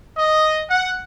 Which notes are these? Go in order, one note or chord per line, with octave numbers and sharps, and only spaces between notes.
D#5
F#5